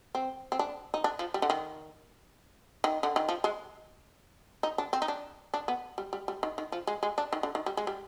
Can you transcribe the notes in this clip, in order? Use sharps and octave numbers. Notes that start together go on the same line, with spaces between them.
C4
C4
D4
D#4
D4
F3
G3
D3
D#3
D#3
D3
D#3
F3
G#3
D#4
D4
C4
D#4
D4
D4
B3
G3
G3
G3
D#3
D#3
F3
G#3
G#3
D4
D#3
D3
D#3
G3
G#3
G3